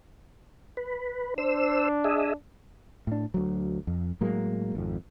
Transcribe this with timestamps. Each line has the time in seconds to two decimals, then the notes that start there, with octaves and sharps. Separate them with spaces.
0.77 B4
1.38 D4 C5 E6
2.04 G#4 D#5 E5
3.07 A2 D4
3.34 D2 F#3
3.87 F2
4.21 A2 F#3 G#3 A#3
4.75 G#1 F2